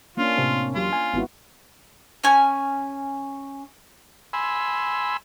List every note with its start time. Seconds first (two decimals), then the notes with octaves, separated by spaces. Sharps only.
0.17 A#3 C#4 D4 F4
0.37 A2 C3 C4
0.75 E2 F#3 F4 G4
0.93 G#5
1.13 G#1 B3 E4 F#4
2.24 C#4 G#5
4.33 G#5 B5 C6 E6